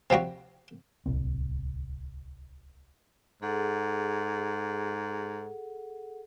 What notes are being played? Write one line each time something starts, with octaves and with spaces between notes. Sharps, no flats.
C3 F3 G3 F#4
D1 C2 C4
G#2 G#4 A4 F#5